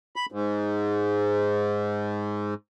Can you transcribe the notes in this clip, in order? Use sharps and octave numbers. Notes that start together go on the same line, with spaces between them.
B5
G#2